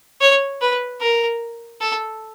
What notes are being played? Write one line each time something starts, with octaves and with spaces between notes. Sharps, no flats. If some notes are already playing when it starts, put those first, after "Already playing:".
C#5
B4
A#4
A4